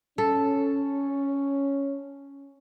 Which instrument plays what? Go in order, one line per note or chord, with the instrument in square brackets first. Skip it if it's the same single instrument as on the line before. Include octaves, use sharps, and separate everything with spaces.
[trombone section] C#4 [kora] A4